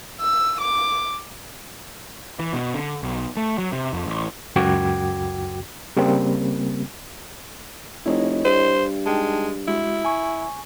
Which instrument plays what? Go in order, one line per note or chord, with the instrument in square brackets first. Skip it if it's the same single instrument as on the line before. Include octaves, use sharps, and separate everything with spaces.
[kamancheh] E6
D6
[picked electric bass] E3
B2
D3
B1
A3
F#3
C3
F2
A1
[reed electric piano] C#2 F#2 F#4 G5 D6 G#6
C#3 G3 A#3 C4
[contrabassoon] F1 [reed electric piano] E4 C#5 D#5
[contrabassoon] G2 [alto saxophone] C5
[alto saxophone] G#3 [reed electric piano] D#4 G5 A5
[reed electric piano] G#3 F#4 [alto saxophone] E4
[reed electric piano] G#5 C#6